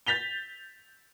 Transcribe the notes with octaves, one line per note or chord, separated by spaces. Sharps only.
G6 A6 B6 F7 G7